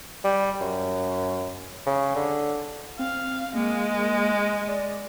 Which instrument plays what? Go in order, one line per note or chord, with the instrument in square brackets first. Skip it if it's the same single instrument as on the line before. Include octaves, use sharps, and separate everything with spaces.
[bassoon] G3
F#2
C#3
D3
[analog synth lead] C4 [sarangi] F5
[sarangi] G#3 [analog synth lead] A#3
[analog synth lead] D5